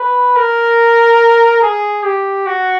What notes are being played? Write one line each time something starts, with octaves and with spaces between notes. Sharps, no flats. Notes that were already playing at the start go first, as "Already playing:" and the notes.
Already playing: B4
A#4
G#4
G4
F#4